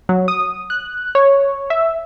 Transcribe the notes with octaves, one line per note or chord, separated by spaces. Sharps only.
F#3
D#6
F#6
C#5
E5